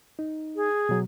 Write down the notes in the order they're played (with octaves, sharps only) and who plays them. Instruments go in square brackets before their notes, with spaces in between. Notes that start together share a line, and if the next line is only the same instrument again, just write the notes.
[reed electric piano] D#4
[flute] G#4
[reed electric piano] B2 F#3